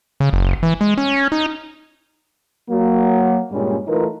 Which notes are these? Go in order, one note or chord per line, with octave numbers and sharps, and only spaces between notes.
C#3
F#1
E3
G#3
C#4
D#4
F#3 A#3 F#4
G2 A#2 G3 G#3 C#4
E3 A3 D#4 F4 A#4 B4